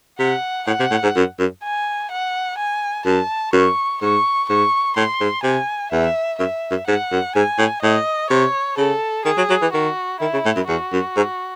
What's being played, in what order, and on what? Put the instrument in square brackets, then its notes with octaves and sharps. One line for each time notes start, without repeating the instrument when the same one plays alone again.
[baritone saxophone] C3 [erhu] F#5
[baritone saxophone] A2 [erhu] F#5
[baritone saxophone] C3
A2
G#2
F#2
F#2
[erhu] G#5
F#5
G#5
[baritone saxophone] F#2 [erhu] A5
[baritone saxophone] F#2 [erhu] C#6
[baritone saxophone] G#2 [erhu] C#6
[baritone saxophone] G#2 [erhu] C#6
[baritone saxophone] A2 [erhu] C6
[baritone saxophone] G#2
[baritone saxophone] C3 [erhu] G#5
[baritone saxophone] E2 [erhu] E5
[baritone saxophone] F#2 [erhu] E5
[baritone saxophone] F#2
[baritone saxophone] G#2 [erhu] F#5
[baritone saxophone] F#2
[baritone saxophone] G#2 [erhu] G#5
[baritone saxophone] A2
[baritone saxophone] A2 [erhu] D#5
[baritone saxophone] C3 [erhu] C#5
[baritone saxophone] C#3 [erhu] A4
[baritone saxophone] D#3 [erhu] G#4
[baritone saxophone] F#3
F#3
E3
[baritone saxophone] D#3 [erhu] F#4
[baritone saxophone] D#3 [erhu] E4
[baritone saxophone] C#3
A2
F#2
[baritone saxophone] E2 [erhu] F#4
[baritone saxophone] F#2
G#2